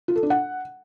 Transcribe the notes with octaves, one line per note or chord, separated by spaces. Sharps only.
F4
A4
D4
F#5